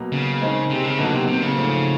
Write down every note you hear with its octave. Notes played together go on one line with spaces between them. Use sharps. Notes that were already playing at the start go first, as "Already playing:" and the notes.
Already playing: B2 F#3 A#3
C#3
D#3 G#3 C4 D#4
C3
C#3
B2 D3 F#3 A#3 D#4 F#4
C3
C3
C#3
G#2 F3 A3 C4